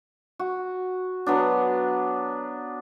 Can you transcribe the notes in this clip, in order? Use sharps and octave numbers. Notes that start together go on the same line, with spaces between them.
F#4
F#3 B3 D4